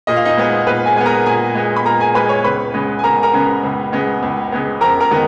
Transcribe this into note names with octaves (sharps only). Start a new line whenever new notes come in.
A#2 D#5
F5
D#4 D#5
G#3 B3
A#2 B4
G#4 G#5
G#3 B3 G#5
A#4 A#5
A#2 G#4 G#5
G#3 B3
B5
A#2 A#4 A#5
G#4 G#5
G#3 B3 B4 B5
C#5 C#6
C#2 B4 B5
C#3 G#3 B3
G#5
C#2 A#4 A#5
A#4 A#5
C#3 G#3 B3
C#2
C#3 G#3 B3
C#2
C#3 G#3 B3
F2 A#4 A#5
A#4 A#5
D#3 G#3 B3